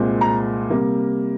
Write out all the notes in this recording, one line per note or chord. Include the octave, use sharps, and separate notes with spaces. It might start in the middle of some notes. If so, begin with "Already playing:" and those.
Already playing: C2 A#2 G#3 C4
A#5
C3 G3 A#3